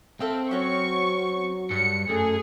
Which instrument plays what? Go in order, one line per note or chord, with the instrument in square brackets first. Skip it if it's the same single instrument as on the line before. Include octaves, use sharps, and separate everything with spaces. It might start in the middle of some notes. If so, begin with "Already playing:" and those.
[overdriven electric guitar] C4 [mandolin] A4 E5 F5
[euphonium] F#3 [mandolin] C#4 F#4 C#5 [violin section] C#6
[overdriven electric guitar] G2 [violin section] C#7
[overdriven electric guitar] F#2 [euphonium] A3 [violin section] G#4